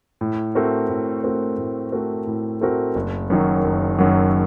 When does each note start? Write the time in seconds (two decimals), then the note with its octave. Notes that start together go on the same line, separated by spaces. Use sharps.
0.21 A2
0.55 A3 C4 F#4 A#4
0.89 A2
1.24 A3 C4 F#4 A#4
1.58 A2
1.92 A3 C4 F#4 A#4
2.27 A2
2.61 A3 C4 F#4 A#4
2.95 F#1
3.30 F#2 D#3 F#3
3.64 F#1
3.98 F#2 D#3 F#3